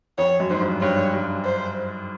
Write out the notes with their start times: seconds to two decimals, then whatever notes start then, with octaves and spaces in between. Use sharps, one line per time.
0.18 F2 C#5
0.40 F#2
0.50 G#2 C5
0.61 G2
0.81 G2 C#5
1.14 G2
1.45 C5